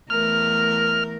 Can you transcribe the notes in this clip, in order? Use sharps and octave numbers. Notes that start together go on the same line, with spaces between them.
E2 A3 A#4 F6